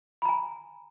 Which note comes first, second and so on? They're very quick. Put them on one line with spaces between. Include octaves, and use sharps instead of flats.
B5 A#5 G#5